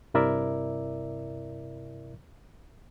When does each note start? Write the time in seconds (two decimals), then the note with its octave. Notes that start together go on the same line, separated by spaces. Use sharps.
0.14 G2 C3 E4 A#4 D5 E5